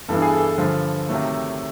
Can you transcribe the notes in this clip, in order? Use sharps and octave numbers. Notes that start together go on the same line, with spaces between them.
G2 E3 G3 B3 D4 A4
G#4
A4
G2 D3 F3
C3 D#3 F#3 A3